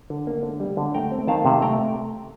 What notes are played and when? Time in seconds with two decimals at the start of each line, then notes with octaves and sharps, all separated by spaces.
0.10 D3
0.27 A#3
0.43 D3
0.60 G3
0.77 D3
0.94 A3 G5 A#5
1.11 C4
1.27 D#3 F5 A5
1.45 C3
1.62 A3 G5 A#5